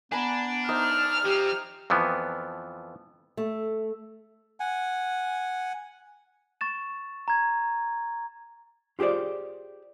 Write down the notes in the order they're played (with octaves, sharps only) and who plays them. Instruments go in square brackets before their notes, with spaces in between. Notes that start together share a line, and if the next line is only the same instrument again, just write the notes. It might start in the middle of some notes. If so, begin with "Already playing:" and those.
[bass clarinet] B3 [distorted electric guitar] D4 [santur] G#5 A#5 B5
[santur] D#4 C5 E5 [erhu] F6
[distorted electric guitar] F3 C4 [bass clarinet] G4
[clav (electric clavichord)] F2 E3 F3 B3
[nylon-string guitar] A3
[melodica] F#5 G#5
[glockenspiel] C#6 A6 E7
A#5 G#6
[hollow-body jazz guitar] F4 G4 G#4 C5 D5